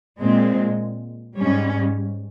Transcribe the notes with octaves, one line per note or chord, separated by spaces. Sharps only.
A#2 G#3 C4
G#2 G3 C#4